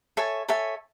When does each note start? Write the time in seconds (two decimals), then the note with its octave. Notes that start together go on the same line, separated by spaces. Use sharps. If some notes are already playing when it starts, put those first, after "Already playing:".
0.17 A4 C#5 E5 G#5
0.48 A4 C#5 E5 G#5